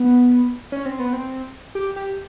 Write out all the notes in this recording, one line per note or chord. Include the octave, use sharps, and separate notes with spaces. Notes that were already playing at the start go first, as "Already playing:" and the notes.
Already playing: B3
C#4
C4
B3
C4
G4
G4